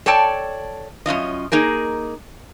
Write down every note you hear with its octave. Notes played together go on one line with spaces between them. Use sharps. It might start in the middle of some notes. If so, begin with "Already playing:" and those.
A4 C#5 D5 G5 A5
F#2 C#4 F4 D#5
A#3 D#4 G#4 A#4